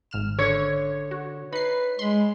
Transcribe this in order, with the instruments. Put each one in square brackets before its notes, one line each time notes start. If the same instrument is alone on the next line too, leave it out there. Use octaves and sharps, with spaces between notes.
[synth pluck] G#1 F6 E7
[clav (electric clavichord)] D3 [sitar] C#5
[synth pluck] F#4
[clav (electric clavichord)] D#4 [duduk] B4 [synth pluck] B5 C7
[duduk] G#3 [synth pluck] B5 C6